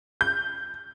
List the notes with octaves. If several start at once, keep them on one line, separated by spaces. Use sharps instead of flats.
G6